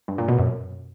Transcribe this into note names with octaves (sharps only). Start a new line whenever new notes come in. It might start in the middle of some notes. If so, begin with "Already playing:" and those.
G2
A#2
B2
F#2